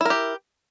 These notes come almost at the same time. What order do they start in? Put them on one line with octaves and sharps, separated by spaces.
E4 A#4 G4